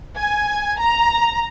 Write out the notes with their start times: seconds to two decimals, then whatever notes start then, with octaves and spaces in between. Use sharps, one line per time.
0.17 G#5
0.78 A#5